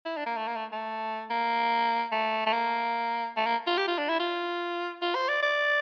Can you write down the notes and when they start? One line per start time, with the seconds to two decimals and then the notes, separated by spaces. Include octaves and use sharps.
0.05 E4
0.17 D4
0.26 A#3
0.37 A3
0.48 A#3
0.56 A3
0.72 A3
1.30 A#3
2.12 A3
2.46 A3
2.53 A#3
3.37 A3
3.46 A#3
3.67 F4
3.77 G4
3.88 F4
3.98 D4
4.09 E4
4.19 F4
5.02 F4
5.15 C5
5.29 D5
5.43 D5